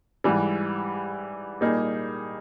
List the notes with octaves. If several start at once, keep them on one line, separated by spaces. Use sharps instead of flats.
G#2 E3 G3
A#2 G3 A#3 D#4 G#4